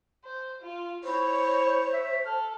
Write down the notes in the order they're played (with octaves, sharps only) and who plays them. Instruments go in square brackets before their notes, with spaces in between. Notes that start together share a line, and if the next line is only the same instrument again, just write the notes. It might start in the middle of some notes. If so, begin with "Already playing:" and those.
[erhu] C5
F4
[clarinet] E4 [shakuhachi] C5 [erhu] C#5
[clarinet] E5
[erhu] A4 [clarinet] F6